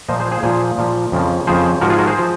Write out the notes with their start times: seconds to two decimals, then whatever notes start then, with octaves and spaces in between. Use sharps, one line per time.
0.08 A#2 F3 C5 D#5
0.20 G#4 C5
0.32 G#4 C5
0.43 A#2 F3 G#4 C5
0.78 A#2 F3
1.12 F2 C#3 F3
1.47 F2 C#3 F3 G#4 C5
1.81 G#2 F3 F#4 A#4
1.90 F4 G#4
1.99 F#4 A#4
2.07 G#4 C5
2.18 F3